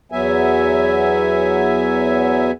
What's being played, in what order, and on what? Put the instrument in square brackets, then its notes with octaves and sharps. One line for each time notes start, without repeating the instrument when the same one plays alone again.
[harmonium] E2 F#3 B3 E5 G#5